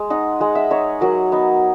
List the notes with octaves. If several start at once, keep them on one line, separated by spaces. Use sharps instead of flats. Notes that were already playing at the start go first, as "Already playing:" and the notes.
Already playing: G#3
D#4 F#5
G#3 F#5
E5
D#4 C#5
F#3 A#4
B3 D#4